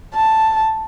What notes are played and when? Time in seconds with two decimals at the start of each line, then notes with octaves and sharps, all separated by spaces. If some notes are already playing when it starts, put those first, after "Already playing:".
0.15 A5